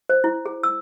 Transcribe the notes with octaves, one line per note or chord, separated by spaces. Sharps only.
C5
E4
G#4
E6